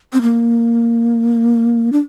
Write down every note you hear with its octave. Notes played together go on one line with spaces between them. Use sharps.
C4
A#3
D4